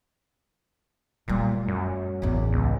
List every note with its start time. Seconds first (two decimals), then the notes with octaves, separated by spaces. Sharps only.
1.28 A#2 G3 A3
1.68 F#2
2.22 A1 E2
2.53 C#2